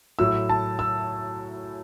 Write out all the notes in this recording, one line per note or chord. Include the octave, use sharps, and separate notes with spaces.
A2 F#3 A3 E6
A5
E6